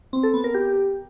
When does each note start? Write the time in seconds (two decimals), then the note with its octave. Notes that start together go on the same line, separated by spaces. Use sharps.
0.13 C4
0.23 A4
0.34 B3
0.44 A#4
0.54 G4